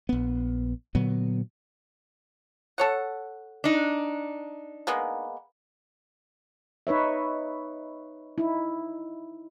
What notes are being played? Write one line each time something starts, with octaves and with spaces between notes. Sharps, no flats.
A#1 B3
A#2 D3 F#3 B3
A4 C#5 F#5
D4 D#4
G#3 A#3 B3
D#4 B4 C#5 E5
D#4 E4